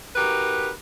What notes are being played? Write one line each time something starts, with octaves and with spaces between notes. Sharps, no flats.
D#4 F#4 G4 A#4 B4